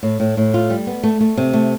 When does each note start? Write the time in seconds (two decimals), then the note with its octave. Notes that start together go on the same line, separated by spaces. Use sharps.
0.03 A2
0.20 A2
0.37 A2
0.54 F4
0.70 G3
0.87 B3
1.03 A3
1.21 A3
1.37 C3
1.53 A3